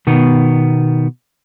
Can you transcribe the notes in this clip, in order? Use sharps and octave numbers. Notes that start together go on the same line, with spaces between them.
B2 D#3 B3